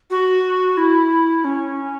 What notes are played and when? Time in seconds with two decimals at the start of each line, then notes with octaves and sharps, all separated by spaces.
0.10 F#4
0.77 E4
1.44 C#4